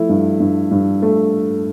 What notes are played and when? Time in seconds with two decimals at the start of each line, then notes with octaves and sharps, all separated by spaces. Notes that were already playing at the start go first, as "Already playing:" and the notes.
Already playing: F3 A3 E4
0.09 G2
0.40 G2
0.71 G2
1.02 A3